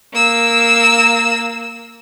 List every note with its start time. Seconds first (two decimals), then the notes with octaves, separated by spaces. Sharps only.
0.13 A#3 E6